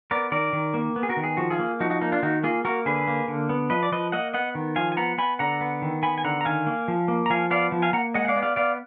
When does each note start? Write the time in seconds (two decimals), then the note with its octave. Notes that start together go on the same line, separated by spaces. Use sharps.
0.11 B3 A#4 D5
0.32 D#3 A#4 D5
0.53 D#3
0.74 A#3
0.96 B3
1.03 G#4
1.09 F#4 A#4
1.17 D#3
1.24 G#4
1.37 F3 F#4
1.50 F4 G#4
1.59 A#3
1.80 F3 D#4 F#4
1.90 D#4 F#4
2.01 A#3 D#4
2.12 D4 F4
2.23 D#3 D#4 F#4
2.44 A#3 F4 G#4
2.65 A#3 F#4 A#4
2.86 D3 G#4 B4
3.07 A#3
3.28 D3
3.49 B3
3.70 F3 B4 D#5
3.83 D5
3.92 F3 B4 D#5
4.12 A#3 D#5 F#5
4.34 B3 D#5 F#5
4.55 D#3
4.76 F3 F5 G#5
4.92 G#5
4.97 B3 F#5 A#5
5.18 B3 G#5 B5
5.39 D3 F#5 A#5
5.61 B3
5.82 D#3
6.03 B3 G#5 B5
6.18 G#5
6.24 D3 F#5 A#5
6.41 A#5
6.45 D#3 F5 G#5
6.67 A#3
6.88 F3
7.08 A#3
7.26 A#5
7.30 F3 F5 G#5
7.51 B3 D5 F5
7.72 F3
7.82 F5 G#5
7.93 A#3 F#5 A#5
8.14 G#3 D#5 F#5
8.25 F#5
8.28 D5 F5
8.36 B3
8.42 D5 F5
8.56 B3 D5 F5